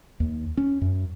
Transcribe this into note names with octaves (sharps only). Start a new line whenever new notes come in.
D#2
C#4
F#2